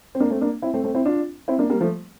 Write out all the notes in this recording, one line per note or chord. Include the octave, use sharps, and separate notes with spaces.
C4
A#3 D4
A3 C4
A#3 D4
C4 E4
A3 C4
A3 C4
C4 E4
D4 F4
C4 E4
A#3 D4
G3 A#3
F3 A3